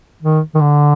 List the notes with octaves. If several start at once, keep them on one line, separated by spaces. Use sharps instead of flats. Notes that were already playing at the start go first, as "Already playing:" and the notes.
D#3
D#3
D3